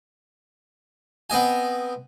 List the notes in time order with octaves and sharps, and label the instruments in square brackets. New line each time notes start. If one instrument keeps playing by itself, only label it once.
[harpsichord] B3 C4 D#5 G#5